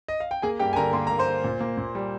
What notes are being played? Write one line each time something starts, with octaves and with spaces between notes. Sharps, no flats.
D#5
F5
G5
A#3 G#4 G#5
G2 G4 G5
G#5
D3 A#4 A#5
A#3 C6
A#3 A#5
C5 C6
A#3
A#2
A#3
A#2
G3